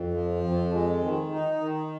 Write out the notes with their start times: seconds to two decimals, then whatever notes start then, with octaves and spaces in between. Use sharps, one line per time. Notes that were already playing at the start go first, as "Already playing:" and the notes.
Already playing: F2
0.14 F3
0.44 F2
0.73 G#3
1.02 D#3
1.31 D#4
1.61 D#3